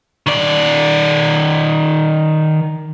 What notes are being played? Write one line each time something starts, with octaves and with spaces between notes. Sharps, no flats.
D#3 D5